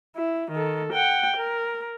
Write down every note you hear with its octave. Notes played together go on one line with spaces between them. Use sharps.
E4
D#3 A4
F#5 G5
A#4